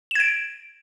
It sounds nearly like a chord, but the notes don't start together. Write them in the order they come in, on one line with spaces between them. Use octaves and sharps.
E7 G#6 D7